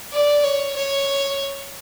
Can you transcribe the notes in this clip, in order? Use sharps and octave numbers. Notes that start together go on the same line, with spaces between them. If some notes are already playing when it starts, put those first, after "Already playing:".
D5
C#5
C#5